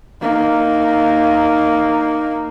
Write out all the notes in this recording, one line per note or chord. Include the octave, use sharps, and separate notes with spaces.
A#3 D#4